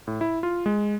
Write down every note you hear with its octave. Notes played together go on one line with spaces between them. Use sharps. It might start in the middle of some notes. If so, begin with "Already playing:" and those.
A2
E4
F4
G#3